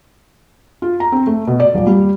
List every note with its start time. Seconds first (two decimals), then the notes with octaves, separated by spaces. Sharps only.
0.82 F4
1.00 A#5
1.12 C4
1.27 A3
1.47 B2
1.60 D5
1.74 D#1
1.87 G3